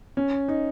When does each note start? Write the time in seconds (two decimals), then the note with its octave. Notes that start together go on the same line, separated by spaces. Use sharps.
0.17 C#4
0.48 D#4